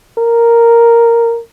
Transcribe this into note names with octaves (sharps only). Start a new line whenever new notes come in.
A#4